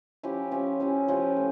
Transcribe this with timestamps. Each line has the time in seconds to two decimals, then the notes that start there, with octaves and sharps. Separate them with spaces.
0.23 F3 C#4 E4 G4
0.52 F3 C#4 E4 G4
0.80 F3 C#4 E4 G4
1.08 F3 C#4 E4 G4
1.36 A2